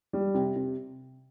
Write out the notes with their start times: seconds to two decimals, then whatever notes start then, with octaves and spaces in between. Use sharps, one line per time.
0.13 G3
0.34 C3
0.56 C3